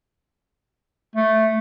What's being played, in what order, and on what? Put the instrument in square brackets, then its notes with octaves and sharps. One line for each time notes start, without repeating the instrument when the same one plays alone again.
[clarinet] A3